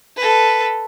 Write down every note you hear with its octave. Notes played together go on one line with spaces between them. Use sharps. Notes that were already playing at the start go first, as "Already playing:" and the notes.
A4 B4